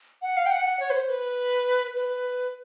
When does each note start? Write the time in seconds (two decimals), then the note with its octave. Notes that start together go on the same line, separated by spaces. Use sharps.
0.22 F#5
0.37 F5
0.46 G5
0.51 F#5
0.65 F#5
0.80 C#5
0.90 B4
0.94 C5
1.09 B4
1.96 B4